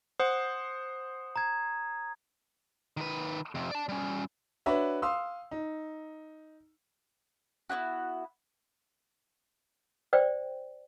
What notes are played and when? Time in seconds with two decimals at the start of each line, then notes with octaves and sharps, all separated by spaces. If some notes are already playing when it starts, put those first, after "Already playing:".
0.20 C5 F#5 D#6
1.36 A#5 G#6
2.97 D#3 B4
3.55 F2 C3
3.71 D5 A5
3.89 G3 C#4
4.66 D4 F#4 B4 C#5 E5
5.02 F5 C6 D#6 E6
5.51 D#4
7.70 B3 D4 E4 F#4
10.13 C5 D5 G5